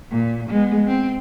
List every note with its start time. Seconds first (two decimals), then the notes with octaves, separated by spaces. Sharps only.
0.11 A#2
0.50 G#3 B3
0.87 C4